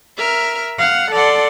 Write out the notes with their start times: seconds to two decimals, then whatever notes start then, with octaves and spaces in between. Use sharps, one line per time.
0.17 A#4 E5 F6
0.78 F5 F#5
1.12 A4 D5 F#5 C6